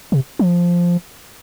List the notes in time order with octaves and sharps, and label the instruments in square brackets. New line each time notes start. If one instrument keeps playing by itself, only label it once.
[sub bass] C3
F3